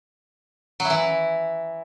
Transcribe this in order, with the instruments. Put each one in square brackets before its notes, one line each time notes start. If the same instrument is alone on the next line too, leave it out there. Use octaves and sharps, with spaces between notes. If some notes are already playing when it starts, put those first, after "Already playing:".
[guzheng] F#3
E4
E3